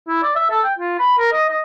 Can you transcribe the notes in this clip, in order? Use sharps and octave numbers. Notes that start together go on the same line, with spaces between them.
E4
D5
E5
A4
G5
F4
B5
A#4
D#5
D#5